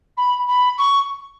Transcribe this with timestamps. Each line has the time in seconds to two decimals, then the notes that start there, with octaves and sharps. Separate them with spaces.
0.17 B5
0.47 B5
0.77 C#6